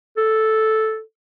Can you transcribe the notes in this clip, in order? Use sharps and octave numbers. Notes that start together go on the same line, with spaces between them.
A4